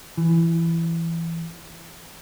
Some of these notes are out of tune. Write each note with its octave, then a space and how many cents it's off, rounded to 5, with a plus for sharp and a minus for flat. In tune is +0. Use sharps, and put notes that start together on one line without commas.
E3 +15